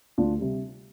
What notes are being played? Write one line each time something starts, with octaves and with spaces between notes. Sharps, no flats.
D2 D4 F4
C3 G3